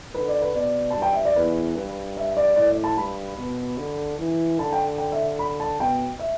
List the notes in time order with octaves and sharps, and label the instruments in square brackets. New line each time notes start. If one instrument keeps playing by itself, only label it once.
[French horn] D3 [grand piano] B4
[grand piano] D5
B4
[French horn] B2 [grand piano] D5
[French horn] G2 [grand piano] A5
[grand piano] G5
E5
D5
[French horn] E2 [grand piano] B4
[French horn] G2
[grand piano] E5
D5
[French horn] A2 [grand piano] D5
[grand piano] D5
A5
[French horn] G2 [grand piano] B5
[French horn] B2
D3
E3
[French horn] D3 [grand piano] A5
[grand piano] G5
G5
E5
B5
A5
[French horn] B2 [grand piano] G5
[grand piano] E5